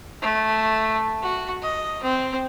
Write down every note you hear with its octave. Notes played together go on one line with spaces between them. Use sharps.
A3
F#4
D#5
C4